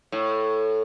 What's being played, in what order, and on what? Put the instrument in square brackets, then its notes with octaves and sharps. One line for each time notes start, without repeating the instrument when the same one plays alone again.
[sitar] A2